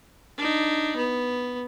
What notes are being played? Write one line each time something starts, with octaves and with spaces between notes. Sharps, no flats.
D4 D#4
B3